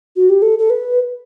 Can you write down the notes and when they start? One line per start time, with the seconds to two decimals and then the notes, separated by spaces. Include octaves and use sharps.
0.16 F#4
0.29 G4
0.42 A4
0.59 A4
0.70 B4